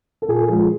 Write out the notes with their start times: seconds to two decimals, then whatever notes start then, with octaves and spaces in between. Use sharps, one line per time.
0.22 A4
0.28 A#2 G#4
0.48 F3 G#3